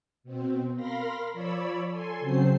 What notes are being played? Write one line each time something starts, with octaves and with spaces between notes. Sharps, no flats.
B2 C4
A#4 F5 B5 C6 A#6
F3 C#5 D5 B5 E6
A4 G#5 C6
C#3 F#3 C4 C5 C7